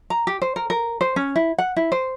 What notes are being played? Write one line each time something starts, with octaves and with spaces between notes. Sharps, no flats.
A#5
G4
C5
A#4
A#4
C5
C#4
E4
F#5
E4
C5